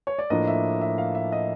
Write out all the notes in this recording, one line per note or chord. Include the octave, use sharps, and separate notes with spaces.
C#5
D5
A2 F3 A#3 D4 D#5
E5
E5
F5
E5
D#5